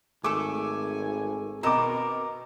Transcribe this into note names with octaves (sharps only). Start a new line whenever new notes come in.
G#1 A3 A4 G#5 D6
B2 C4 A#4 D#5 A#5 D6